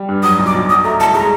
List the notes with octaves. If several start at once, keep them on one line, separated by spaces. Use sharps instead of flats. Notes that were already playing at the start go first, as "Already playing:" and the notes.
Already playing: G3
G2
F#3 D#6
B1
D6
B1
F#3 D#6
A3 A#5
C2 A5
G#3 A#5